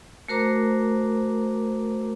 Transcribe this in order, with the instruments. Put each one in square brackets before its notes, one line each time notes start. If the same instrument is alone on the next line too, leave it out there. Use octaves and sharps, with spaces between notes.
[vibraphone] A3 F#4 A#4 C5 A#5 D6